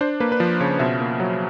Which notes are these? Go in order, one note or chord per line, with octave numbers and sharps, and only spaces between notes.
D4 C5
A#3 B4
B4
F3 C5
C#3 C#5
B2 E5
A#3
F#3